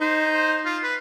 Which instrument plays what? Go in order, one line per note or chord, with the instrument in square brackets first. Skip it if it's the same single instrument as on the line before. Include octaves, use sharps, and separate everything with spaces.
[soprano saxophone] D#4 [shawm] C5
[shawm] C5
F4
B4